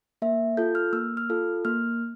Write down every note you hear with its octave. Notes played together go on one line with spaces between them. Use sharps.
A#3 E5
F4 A4 G6
F6
A#3 E6
F6
F4 A4
A#3 F6